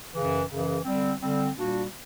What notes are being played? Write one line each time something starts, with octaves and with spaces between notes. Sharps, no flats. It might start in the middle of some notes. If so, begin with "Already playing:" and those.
F#2 C#3 E3
F#2 C#3 E3
D3 G3 C4
D3 G3 C4
A#2 G3 A#3 D4 F#4